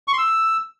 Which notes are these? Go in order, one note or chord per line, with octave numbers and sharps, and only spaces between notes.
C#6
C6
E6